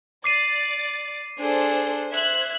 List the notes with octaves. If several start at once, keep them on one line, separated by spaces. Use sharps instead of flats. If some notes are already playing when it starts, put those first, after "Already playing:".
D5 D6 A6 C7 D#7
D4 G#4 A4 C5
C5 E5 F#6 G#6